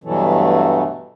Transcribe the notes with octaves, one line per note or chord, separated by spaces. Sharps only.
G2 B2 E3 F#3 A3